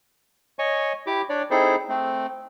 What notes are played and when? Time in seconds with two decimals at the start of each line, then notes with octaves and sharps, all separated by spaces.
0.59 C#5 D#5 G#5 C#6
1.07 E4 G4 D6
1.29 D4 C#5 D5
1.51 C4 D#4 E4 G#4 A4 C5
1.89 A3 C4